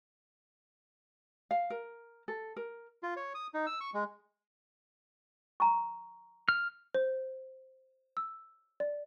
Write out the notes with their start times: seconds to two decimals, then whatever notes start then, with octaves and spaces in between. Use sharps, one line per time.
1.51 F5
1.70 A#4
2.28 A4
2.56 A#4
3.03 F4
3.17 C#5
3.34 D#6
3.54 D#4
3.67 E6
3.81 C#6
3.94 G#3
5.60 A#5 C#6
6.49 F6
6.94 C5
8.17 E6
8.80 D5